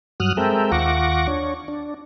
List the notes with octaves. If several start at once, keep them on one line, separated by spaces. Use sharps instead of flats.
G2 F#3 D#6 F6 F#6
G#3 C4 A4 A#4 E5 G5
D#2 F4 F#5 C#6 D6 A#6
D4 C#5
D4